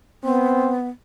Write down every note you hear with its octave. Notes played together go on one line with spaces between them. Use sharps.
B3 C4